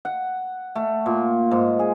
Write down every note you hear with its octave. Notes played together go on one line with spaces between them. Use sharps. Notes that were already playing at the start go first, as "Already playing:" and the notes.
F#5
A3
A#2
G#2
G#4